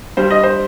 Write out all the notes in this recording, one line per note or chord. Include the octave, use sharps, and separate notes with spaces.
G2 G3 C5
D#5
C5